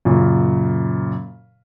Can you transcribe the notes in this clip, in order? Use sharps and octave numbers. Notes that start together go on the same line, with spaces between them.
F#2 A#2 C#3